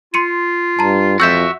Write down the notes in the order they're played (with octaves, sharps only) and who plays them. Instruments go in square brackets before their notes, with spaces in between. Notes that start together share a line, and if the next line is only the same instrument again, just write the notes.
[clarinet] F4 [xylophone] C6 C#7 D#7
[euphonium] G2 [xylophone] A5 A#5
[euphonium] F2 [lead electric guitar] F#4 E5 [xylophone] E6 G6 B6